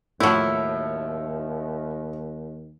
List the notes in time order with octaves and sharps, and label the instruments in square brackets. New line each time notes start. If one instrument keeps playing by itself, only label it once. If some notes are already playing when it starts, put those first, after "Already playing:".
[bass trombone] D#2 [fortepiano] A2 F3 [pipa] F#3 E4